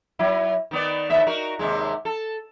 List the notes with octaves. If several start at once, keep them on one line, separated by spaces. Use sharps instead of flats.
F#3 E4
D#3 B3 D5
D#2 B3 E5
D#4 F#4 A#4
D#2 C3 G#3
A4